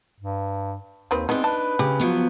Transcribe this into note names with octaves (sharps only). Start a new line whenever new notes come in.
G2
D#2 D#3 C4 B4
G#3 B3 C4 D4 D#4
B4 A5
C#3 G4
F3 F#3 B3